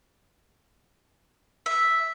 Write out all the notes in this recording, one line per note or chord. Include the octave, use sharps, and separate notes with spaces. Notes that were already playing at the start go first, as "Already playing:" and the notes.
E5